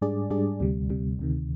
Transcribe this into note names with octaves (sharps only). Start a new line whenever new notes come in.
G#2 G3 D4 G#4 D5
G#2 G3 D4 G#4 D5
D2 C3 G3
D2 C3 G3
D2 C3 D#3